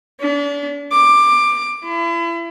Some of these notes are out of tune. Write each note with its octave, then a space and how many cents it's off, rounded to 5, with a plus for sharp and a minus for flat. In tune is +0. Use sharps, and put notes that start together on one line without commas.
D4 -40
D6 +15
E4 +35